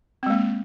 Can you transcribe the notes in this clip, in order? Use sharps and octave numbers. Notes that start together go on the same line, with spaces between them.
G#3 A#3 C4